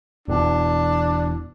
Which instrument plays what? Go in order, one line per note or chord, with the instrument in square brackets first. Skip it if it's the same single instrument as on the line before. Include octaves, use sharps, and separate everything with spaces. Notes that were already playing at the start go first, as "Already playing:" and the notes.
[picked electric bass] E1 B2 E3 [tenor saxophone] D4